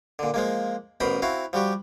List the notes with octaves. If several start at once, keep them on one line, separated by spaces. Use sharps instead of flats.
A#2 D3
F3 G#3 A#3
A1 B2 A#4 C5 A#5 B5
C4 E4 F#4 F5
F3 G3 F#4 G4